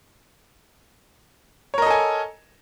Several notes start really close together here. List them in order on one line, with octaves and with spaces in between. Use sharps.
C#5 A#4 D#5 A4 G#5